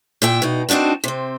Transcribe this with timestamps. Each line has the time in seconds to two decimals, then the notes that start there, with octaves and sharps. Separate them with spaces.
0.22 A#2 E5 G5
0.42 B2 D#4
0.69 C4 D4 D#4 F#4 A5
1.04 C3 C4